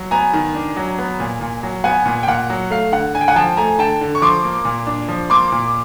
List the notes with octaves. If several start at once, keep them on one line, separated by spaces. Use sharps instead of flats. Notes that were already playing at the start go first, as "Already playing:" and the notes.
Already playing: F#3
B3 G#5 A#5
D#3
D4
F#3
B3
A#2
A#2
F#3
B3 F#5 G#5
A#2
G5
A#2 F#5
F#3
A3 F5
D3 F#5
D3 G#5
G5
F#5 G#5
F3 G5 A5
A3 G#5 A#5
D3 G5 A5
D3
C#6
F3 C6 D6
A#3
A#2
D4
F3
A#3 C6 D6
A#2